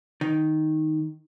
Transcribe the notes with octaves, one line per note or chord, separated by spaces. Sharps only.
D#3